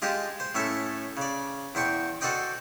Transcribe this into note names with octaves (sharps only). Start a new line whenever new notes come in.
G#3 F4 G4 D#5 A5
C5
A2 C#4 A4 E5 A5
C#3 D5
E2 C5 G5 C#6
F#4 A4 C5 D5 D#5 G5